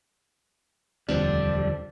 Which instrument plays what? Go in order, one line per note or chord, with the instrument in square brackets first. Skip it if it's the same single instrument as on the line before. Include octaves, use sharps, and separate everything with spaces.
[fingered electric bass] E1 D2 [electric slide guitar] D3 G3 [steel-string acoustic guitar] F3 C4 D4 [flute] D5